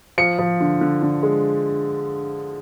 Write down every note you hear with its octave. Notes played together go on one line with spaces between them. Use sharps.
F3 C#7
F3
D3
D3
D3
G#3